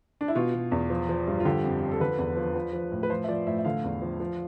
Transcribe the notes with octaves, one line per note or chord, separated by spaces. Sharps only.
D4
E4
B2 F4
B2
E2
F3
F3
G2
F4
D3 G4
F2
F3
A4
D3 B4
E2
F3
F3
F3
A2
B4
F3 C5
E5
F3 D5
A2 E5
E5
D3 F5
E2
F3
F3